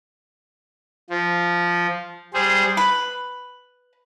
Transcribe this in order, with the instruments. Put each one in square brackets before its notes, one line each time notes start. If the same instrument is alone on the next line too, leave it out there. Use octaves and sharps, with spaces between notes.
[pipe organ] F3
G3 G#4 C5
[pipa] B4